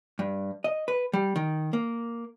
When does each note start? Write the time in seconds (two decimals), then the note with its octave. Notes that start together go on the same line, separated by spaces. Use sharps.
0.19 G2
0.64 D#5
0.88 B4
1.13 G3
1.36 D#3
1.73 A#3